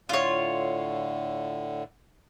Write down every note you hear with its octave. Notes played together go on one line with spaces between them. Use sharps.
A2 D3 F4 C#5